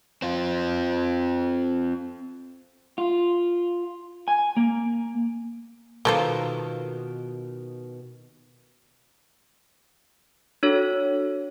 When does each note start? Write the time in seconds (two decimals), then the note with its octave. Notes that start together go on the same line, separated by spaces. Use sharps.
0.22 C4 F4
2.98 F4
4.28 G#5
4.57 A#3
6.05 B2 D#3 A#3 F4 A4 C5
10.63 D4 F#4 A4 C#5